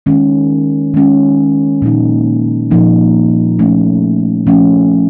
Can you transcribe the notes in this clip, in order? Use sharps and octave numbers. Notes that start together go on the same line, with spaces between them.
D#3 G#3 C#4
D#3 G#3 C#4
A#2 F3 A#3 D#4
A#2 F3 A#3 D#4
F3 A3 C#4
F3 A3 C#4